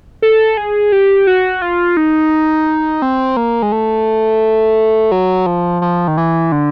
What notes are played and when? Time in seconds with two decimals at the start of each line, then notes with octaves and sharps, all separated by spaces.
0.22 A4
0.57 G#4
0.92 G4
1.27 F#4
1.62 F4
1.97 D#4
3.02 C4
3.37 A#3
3.62 G#3
3.72 A3
5.12 F#3
5.46 F3
5.82 F3
6.08 D#3
6.17 E3
6.52 D3